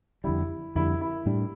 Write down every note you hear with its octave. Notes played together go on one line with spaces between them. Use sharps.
F2 D3 G3 E4
F2 D3 G3 E4
E4
A2 G3 D4